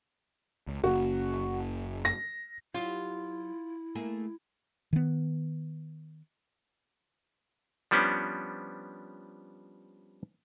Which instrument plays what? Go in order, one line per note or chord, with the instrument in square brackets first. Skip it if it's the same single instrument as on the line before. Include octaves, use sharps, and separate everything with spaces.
[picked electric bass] C#2
[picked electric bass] F#1 C#3 A#3 [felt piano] F#4
[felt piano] A#6
[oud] F#3 G4 [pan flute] E4 [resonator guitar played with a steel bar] F4
[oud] A3 A#3 G#4
[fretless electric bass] D#3 B3
[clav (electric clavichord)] F3 G3 B3 C#4 D4